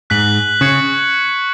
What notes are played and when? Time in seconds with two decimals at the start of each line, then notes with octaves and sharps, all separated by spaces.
0.10 G#2 F#6 B6 F#7
0.61 C#3 C#6 G#6 C#7